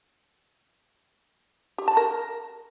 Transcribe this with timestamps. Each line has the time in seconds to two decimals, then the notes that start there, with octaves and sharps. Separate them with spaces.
1.78 G4
1.88 A5
1.97 A#4